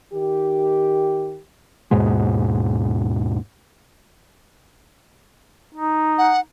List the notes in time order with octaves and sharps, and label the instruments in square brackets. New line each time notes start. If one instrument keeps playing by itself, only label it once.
[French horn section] D#3 G4
[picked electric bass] D#2 G#2 B2 G#3
[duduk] D#4
[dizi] F#5